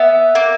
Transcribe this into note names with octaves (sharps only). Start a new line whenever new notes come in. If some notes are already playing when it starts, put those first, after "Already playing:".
Already playing: B3 E5
A#3